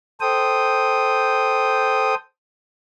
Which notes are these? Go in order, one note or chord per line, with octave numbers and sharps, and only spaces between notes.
A4 C5 G5 D#6